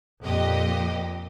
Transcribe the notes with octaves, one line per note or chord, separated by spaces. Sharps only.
F2 A#2 G4 D#5